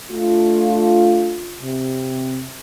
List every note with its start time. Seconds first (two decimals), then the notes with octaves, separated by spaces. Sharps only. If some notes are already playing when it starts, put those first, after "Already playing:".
0.11 A3 D4 F4
1.61 C3